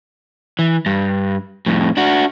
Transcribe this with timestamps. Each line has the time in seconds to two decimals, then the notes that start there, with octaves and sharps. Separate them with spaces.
0.59 E3
0.86 G2
1.66 F2 A2
1.97 D4 F#4